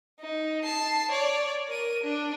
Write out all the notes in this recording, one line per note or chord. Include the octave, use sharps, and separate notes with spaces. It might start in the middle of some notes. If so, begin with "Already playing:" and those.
D#4
A5 C7
C#5 D5
A#4 D#7
D4